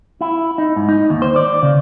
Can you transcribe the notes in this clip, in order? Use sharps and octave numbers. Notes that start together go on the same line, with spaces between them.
E4
D#4
G#2
D#4
D#2
C5
D5
C#3